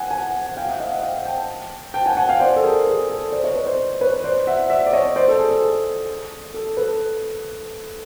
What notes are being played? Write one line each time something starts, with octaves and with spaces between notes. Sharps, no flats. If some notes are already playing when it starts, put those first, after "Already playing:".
Already playing: F#5 G#5
F#5 G#5
F#5
F5 G5
E5 F#5
D#5 F5
E5 F#5
F5 G5
G5 A5
G5 A5
F#5 G#5
F#5 G#5
F5 G5
C5 D5
A4
G#4 A#4
G#4
A4
C5 D5
C#5 D#5
B4 C#5
C5 D5
B4 C#5
C5 D5
E5 F#5
D5 E5
D5
C#5 D#5
C5 D5
A4
G#4
A4
G#4
A4
A4 B4